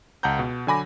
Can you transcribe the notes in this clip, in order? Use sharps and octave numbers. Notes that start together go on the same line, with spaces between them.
C#2 F#5 A5 A#5 G6
B2
D3 F#3 G#5 B5 D6 A#6